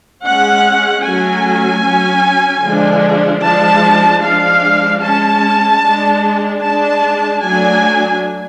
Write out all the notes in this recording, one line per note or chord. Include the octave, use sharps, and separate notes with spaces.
G#3 C#4 F#5
F#3 A3 C#4 G#5
F#3 C#4
D3 F3 G#3 D4
F3 G#3 D4 A5
F3 G#3 D4 F5
G#3 C#4 A5
G#3 D4
G#3 D4 A5
F#3 A3 D4 G#5